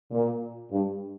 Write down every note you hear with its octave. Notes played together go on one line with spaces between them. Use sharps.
A#2
G2